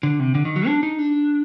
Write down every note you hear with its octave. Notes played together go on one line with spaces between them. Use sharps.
D3
C3
D3
D#3
F#3
D4
D#4
D4